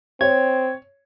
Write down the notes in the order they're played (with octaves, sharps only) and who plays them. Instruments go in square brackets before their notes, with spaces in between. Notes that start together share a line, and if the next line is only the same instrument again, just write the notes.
[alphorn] C4 [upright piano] C#5 [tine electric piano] G#6